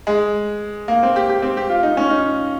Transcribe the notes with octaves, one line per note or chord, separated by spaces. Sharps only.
G#3
A#3
C4
G4
G4
C4
G4
F4
D#4
C#4
D#4